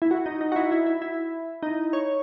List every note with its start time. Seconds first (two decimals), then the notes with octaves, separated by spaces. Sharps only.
0.02 E4
0.11 F#4
0.26 D#4
0.41 D#4
0.52 F#4
0.56 E4
0.72 E4
0.86 E4
1.02 E4
1.63 D#4
1.93 C#5